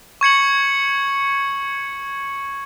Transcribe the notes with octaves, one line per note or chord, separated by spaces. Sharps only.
C#6 G#6 C#7 F#7